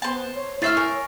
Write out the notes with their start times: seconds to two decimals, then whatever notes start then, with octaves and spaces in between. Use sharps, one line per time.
0.02 B3 C5 A5
0.35 C#5
0.62 A3 E4 C#5 E5 F6 A6 C7
0.77 A#4 G#5 C#6